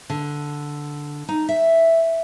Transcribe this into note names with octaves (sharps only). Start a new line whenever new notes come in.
D3
D#4
E5